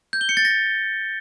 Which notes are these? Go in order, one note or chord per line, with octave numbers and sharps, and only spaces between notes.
G6
G7
C#7
A6
A#6